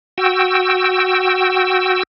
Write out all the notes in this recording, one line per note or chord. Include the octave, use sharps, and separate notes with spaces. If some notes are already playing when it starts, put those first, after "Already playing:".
F#4 G5 E6